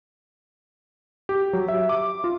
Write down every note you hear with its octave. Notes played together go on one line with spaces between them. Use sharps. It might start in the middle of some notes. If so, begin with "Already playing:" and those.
G4
F#3
E5
D6
F4